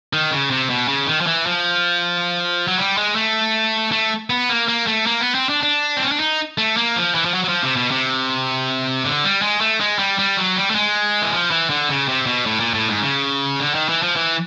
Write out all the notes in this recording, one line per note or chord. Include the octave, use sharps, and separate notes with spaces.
D#3
C#3
C3
B2
C#3
D#3
F3
E3
F3
F#3
G3
G#3
A3
A3
B3
A#3
A#3
A3
A#3
B3
C4
D4
D4
C4
C#4
D4
D#4
A3
A#3
F3
E3
F3
F#3
F#3
F3
C3
B2
C3
D3
G3
G#3
A3
G#3
G3
G3
F#3
G3
A3
G#3
E3
F3
E3
D3
C#3
C3
B2
A2
A#2
A2
G#2
C#3
D3
D#3
E3
F3
E3